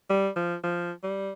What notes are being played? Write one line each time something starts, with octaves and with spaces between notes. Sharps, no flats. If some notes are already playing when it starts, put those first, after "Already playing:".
G3
F3
F3
G3